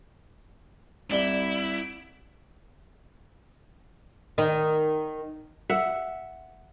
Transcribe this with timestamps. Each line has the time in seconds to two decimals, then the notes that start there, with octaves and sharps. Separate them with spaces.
1.11 C2 E4 D5 G7
4.38 D#3
5.70 E5 F#5